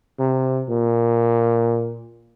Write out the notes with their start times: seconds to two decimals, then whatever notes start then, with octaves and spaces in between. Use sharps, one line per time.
0.19 C3
0.69 A#2